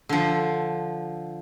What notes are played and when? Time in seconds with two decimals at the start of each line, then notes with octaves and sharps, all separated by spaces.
0.09 D3 F3